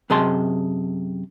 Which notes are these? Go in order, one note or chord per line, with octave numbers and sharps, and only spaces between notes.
F#2 C3 G#4 D#5 A5 C6